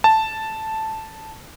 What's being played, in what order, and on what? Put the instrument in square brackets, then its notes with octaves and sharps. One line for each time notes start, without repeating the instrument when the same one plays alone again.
[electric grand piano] A5